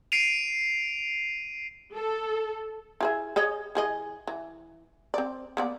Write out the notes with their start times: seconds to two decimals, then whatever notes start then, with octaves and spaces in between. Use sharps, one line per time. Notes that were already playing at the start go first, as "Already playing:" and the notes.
0.12 C7 D7 D#7 F7
1.93 A4
3.01 E4 G#4 E5
3.36 G#4 C#5 D#5
3.75 E3 G#4 D#5
4.27 E3
5.14 C4 D5
5.57 A#3 B3 D5